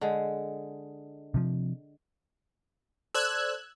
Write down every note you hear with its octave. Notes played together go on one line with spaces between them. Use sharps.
D3 G#3
C3 F3
A4 C5 D5 E6 F#6 G#6